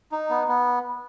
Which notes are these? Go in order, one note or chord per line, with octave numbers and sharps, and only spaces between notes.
D#4
B3
B3